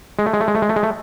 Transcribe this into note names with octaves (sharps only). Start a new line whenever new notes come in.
G#3
A3
G#3
A3
G#3
A3
G#3
A3
G#3
A3